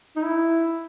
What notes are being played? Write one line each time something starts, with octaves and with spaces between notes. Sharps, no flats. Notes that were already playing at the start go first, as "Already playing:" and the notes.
D#4
E4